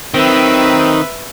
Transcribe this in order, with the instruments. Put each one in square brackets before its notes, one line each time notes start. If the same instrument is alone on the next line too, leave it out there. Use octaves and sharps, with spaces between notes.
[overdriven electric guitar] D#3 [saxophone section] F#3 C4 [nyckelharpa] B4 E5